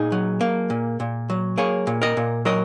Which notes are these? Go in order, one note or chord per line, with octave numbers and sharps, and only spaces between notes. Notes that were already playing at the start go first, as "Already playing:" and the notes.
Already playing: A#2 D#4 G#4
F#3
A#3
A#2
A#2
F#3
A#3 G#4 C#5
A#2
A#4 D#5
A#2
F#3 A#4 D#5